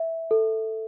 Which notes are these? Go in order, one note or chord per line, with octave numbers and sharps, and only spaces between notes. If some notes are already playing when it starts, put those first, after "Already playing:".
Already playing: E5
A4